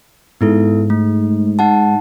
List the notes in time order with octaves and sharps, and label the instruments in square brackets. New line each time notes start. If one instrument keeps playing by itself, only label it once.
[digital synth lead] G#2 [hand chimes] B3 E4 A4
[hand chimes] A3
D#4 F#5 A5